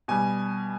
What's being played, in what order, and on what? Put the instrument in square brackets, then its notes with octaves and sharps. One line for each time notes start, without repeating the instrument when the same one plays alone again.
[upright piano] B2 G3 G#5